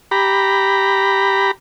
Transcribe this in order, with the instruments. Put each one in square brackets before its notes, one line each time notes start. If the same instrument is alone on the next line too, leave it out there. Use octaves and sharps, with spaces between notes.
[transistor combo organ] G4 A#5 B5